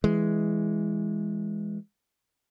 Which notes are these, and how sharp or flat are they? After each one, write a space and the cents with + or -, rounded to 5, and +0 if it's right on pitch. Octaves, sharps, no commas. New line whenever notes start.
E3 +0 G#3 +0